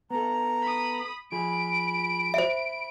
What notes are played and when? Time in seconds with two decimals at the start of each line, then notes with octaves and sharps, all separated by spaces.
0.10 B3 A4 A#5
0.63 B5 D#6
1.32 F3 G#4 B5 D7
2.34 C5 E5